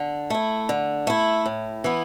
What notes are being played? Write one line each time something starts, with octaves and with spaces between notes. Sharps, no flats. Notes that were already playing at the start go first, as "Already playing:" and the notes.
Already playing: D3
A3 E4
D3
A3 E4
A2
E3 B3 E4